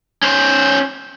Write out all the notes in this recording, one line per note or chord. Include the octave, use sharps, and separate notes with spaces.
C#4 C5